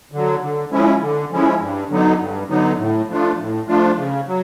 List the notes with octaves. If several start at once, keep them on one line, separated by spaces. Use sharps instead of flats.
D3 F#3
D3
F3 G#3 C#4 E4
D3
F3 G#3 C#4 E4
G2
D3 F#3 B3 D#4
G2
D3 F#3 B3 D#4
A2
F3 A3 D4 F4
A2
F3 A3 D4 F4
C#3
F#3